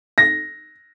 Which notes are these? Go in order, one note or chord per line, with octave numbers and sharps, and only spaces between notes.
A#6